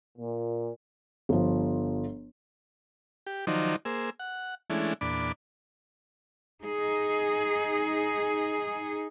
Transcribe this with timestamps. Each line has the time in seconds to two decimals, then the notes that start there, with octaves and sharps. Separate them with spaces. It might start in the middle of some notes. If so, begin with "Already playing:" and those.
0.18 A#2
1.29 G1 F3
3.27 G4
3.47 D#3 F3 F#3 D#4 C5 D5
3.85 A#3 G#4 C5 E6
4.20 F#5
4.70 E3 G#3 A3 C#4 D4 E4
5.01 E2 A#2 D4 B5 D6
6.64 D#4 G#4